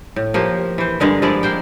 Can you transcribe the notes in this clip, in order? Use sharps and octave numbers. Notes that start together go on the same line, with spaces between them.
A2
F3 A#3 G4
E3 C5
G2 D3 G#3 A#4
F3 G#3 E4 D5
A#3 C5 G5